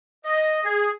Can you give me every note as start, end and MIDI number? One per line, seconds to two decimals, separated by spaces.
0.25 0.61 75
0.64 0.90 68